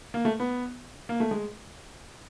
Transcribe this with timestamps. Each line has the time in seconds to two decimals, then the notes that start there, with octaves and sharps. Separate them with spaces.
0.14 A#3
0.25 A3
0.40 B3
1.09 A#3
1.20 A3
1.31 G#3